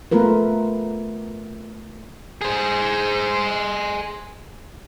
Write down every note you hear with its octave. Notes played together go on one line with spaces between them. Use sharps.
A3 B3 F4 A#4 B4
G#4 C5